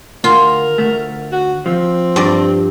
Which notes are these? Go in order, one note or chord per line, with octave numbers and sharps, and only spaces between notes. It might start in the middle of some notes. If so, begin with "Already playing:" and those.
D2 F4 A#4
D2 A3
F#4
F3 C4
G2 D5